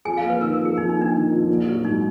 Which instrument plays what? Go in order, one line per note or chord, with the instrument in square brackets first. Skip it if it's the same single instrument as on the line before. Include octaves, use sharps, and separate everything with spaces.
[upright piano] F2 [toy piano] G#4 G#5
[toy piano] F4 F5
[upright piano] A#3
[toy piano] B4
[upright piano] D#3 [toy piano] A#4
[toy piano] A#4
[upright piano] F2
[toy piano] G#4
[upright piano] F2 [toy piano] D#4
[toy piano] D#4
[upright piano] A#3
[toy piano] D4
[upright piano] D#3
F2
A#1
F#3
[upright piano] G#2 [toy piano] D#4